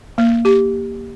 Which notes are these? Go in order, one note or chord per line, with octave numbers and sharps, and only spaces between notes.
A#3
G4